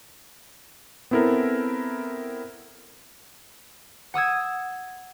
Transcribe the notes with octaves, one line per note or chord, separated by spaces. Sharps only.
B3 C4 E4 A4 A#4
F#5 D#6 E6 G#6